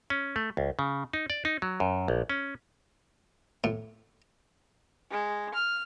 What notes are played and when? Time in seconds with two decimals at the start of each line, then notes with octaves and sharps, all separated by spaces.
0.10 C#4
0.36 A3
0.57 C#2
0.79 C#3
1.13 D#4
1.30 D5
1.45 D#4
1.62 F#3
1.80 F#2
2.08 A#1
2.30 C#4
3.64 A2
5.12 G#3
5.54 F6